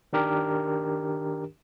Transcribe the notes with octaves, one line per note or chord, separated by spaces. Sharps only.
D#3 D4 G4 A#4